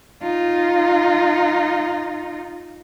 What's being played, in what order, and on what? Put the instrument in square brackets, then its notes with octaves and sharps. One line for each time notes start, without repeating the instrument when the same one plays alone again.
[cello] D#4 F4